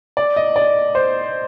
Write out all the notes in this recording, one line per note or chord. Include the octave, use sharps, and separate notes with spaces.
D5
D#5
D5
C5